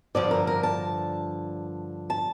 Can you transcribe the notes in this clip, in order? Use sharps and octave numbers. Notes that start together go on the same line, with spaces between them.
G2 D3 F3 D5
A#4
A#4
A5
A5